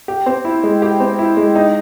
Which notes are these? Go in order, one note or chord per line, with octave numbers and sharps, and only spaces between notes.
G4
C4
E4
G#3
G4
C4
E4
G#3
D#4